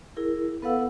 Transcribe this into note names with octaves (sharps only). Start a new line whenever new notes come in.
E4 G#4 A#4
B3 A4 B4 F5 F#5 E6